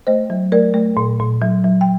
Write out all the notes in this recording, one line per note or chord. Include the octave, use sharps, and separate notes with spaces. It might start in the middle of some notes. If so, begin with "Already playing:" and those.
A3 C5 D#5
F#3
A3 A#4 D5
A3
A#2
A#2
F#3
F#3
G5